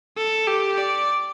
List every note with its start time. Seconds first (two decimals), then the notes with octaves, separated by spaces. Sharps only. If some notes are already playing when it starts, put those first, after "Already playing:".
0.17 A4
0.47 G4
0.78 D5